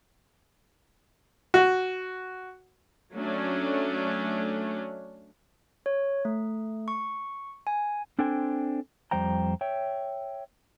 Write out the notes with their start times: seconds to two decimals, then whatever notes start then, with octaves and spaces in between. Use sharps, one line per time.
1.54 F#4
3.13 F#3 A3 C#4 D4
5.86 C#5
6.25 A3
6.88 C#6
7.67 G#5
8.19 C4 D4 A4 C5 G5 G#5
9.11 F2 G3 C5 G5 A#5
9.61 C#5 E5 G5